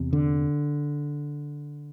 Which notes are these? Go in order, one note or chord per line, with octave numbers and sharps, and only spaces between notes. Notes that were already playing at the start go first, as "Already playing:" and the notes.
Already playing: E2 C3
D3